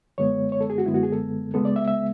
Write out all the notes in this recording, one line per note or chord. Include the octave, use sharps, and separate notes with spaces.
F#2 D3 G#3 B3 C#5
C#5
A4
G#4
F#4
F#2 D3 G#3 B3 E4
F#4
G#4
A4
C#2 C#3 G#3 B3 A4
D5
E5
E5